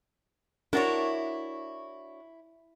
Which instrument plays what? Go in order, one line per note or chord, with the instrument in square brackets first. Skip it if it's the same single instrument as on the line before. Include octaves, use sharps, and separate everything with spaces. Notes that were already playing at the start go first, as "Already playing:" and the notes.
[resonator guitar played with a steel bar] D4 F#4 C#5 [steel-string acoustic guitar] E4 [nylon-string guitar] A#4